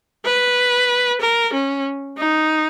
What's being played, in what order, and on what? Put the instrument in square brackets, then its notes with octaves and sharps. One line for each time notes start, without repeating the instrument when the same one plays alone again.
[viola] B4
A#4
C#4
D#4